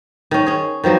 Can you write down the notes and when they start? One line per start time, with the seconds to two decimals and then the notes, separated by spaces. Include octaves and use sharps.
0.31 D#3 C#4
0.46 C#4 G#4
0.84 D#3 F3 F#3 B3